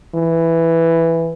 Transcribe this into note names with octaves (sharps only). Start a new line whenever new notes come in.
E3